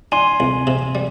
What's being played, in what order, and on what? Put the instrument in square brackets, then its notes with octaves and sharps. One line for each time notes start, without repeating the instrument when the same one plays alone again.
[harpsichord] D4 [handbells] G#5 C6
[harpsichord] C2
C3
G3